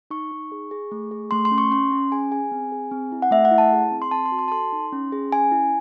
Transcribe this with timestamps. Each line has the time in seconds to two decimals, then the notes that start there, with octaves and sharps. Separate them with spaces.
0.11 D#4 C#6
0.31 D#4
0.52 G#4
0.71 G#4
0.92 A3
1.11 G#4
1.31 A3 C6
1.45 C6
1.51 C#4
1.58 C#6
1.71 C#4 C6
1.91 C#4
2.12 G#4 G#5
2.32 G#4 G#5
2.52 C4
2.72 G#4
2.91 C4
3.12 E4
3.22 F#5
3.31 A3 E5
3.45 F#5
3.51 E4
3.58 A5
3.72 G#4
3.91 C4
4.02 C6
4.11 C4 A5
4.26 C6
4.32 F#4
4.39 C6
4.48 A5
4.51 A4 C6
4.73 D#4
4.93 C#4
5.12 G#4
5.32 C#4 G#5
5.51 E4